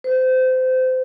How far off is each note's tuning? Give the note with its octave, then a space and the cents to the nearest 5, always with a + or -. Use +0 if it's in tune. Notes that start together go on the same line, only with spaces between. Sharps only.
C5 -25